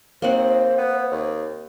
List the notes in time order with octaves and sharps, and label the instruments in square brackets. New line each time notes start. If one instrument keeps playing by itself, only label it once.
[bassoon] D#2 [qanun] A#3 C4 F#5 [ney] C5
[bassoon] B3
D#2